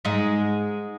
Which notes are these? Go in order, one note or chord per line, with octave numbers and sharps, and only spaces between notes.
G#2 G#3